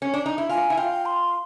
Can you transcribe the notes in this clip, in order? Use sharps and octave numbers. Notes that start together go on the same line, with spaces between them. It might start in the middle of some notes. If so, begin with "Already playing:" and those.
C#4
D4
D#4
E4
F4 G#5
E4
F4 G5
C6